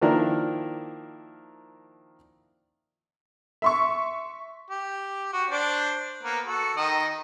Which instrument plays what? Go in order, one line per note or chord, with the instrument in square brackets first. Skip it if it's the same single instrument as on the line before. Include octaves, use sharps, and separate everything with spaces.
[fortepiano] D#3 F3 A#3 D4 E4 A#4
[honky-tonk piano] E5 C6 C#6
[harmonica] G4
F#4
D4 C5 D5
A#3 B3
F#4 A4
D#3 D#5